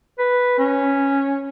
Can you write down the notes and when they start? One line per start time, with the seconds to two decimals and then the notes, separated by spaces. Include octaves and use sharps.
0.19 B4
0.59 C#4